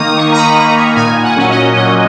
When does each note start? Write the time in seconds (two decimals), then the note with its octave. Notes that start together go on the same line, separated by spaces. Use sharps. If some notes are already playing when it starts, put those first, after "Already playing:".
Already playing: D#3 A#3 D#4 D#6 F6
0.17 D#3 C#6
0.32 A#5
0.37 B5
0.57 A#3 D#4 A#5
0.77 G#5
0.96 A#2 G#5
1.23 F#5
1.36 F#3 C#4
1.50 D#5
1.77 A#2 D#5